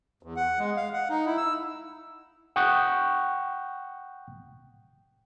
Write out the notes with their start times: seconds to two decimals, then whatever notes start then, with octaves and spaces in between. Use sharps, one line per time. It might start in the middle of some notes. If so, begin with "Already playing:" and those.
0.23 E2
0.36 F#5
0.59 G#3
0.77 F5
0.93 F#5
1.10 D#4
1.26 E4
1.38 E6
2.56 F#5 G5 C#6 D#6 F#6 G6